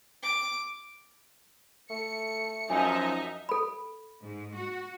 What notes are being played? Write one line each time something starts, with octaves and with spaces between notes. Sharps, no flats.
D6
A3 C#7
F#2 F3 D#4 D#5 E5 G#5
A4 B5
G#2
F#4